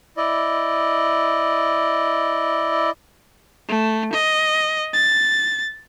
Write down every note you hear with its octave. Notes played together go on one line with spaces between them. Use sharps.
E4 D5 D#5
A3
D#5
A6